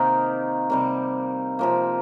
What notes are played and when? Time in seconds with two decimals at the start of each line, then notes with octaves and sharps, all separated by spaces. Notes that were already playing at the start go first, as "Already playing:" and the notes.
Already playing: C3 D#3 A#3 D#4
0.70 C3 G3 A#3
1.59 C3 F3 A#3